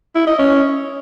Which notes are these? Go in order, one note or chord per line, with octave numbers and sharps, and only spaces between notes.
E4
D#5
C#4